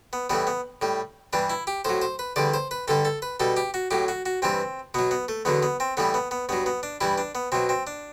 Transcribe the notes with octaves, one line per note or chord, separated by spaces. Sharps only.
B3
A2 E3 G3 B3
B3
A2 G3
G2 E3 G3 D4
E4
G4
A2 F#3 C5
C5
B4
E2 D3 G3 D5
C5
B4
G2 D3 G3 A4
A4
B4
B2 G3 A4
G4
F#4
A2 F#3 G4
F#4
F#4
G2 E3 G3 C4
B2 F#3 B3
B3
A3
E2 D3 F#3 B3
B3
C4
A2 E3 G3 B3
B3
B3
G2 F#3 B3
B3
D4
G2 E3 G3 E4
D4
B3
B2 F#3 C4
C4
D4